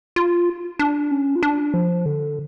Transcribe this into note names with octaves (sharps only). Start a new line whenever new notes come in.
F4
D4
C#4
F4
D4
F3
D3